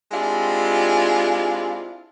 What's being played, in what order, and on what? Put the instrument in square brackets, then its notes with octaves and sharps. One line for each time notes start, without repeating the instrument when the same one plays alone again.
[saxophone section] G#3 C4 D4 E4 F4 G4